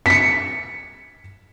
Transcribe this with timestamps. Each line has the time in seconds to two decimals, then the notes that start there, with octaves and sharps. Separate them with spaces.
0.06 B6 C#7